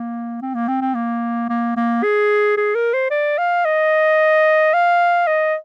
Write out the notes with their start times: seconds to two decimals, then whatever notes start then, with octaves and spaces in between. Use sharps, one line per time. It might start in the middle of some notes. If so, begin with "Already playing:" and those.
Already playing: A#3
0.42 C4
0.55 A#3
0.68 C4
0.81 C4
0.94 A#3
1.49 A#3
1.77 A#3
2.03 G#4
2.57 G#4
2.75 A#4
2.94 C5
3.11 D5
3.38 F5
3.65 D#5
4.73 F5
5.27 D#5